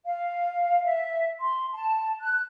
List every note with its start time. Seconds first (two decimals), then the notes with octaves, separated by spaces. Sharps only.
0.06 F5
0.84 E5
1.39 C6
1.73 A5
2.20 F#6